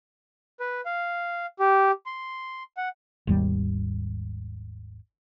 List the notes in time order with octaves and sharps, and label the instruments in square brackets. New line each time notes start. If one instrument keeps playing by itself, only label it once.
[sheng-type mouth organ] B4
F5
G4
C6
F#5
[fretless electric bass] G#1 D#2 G3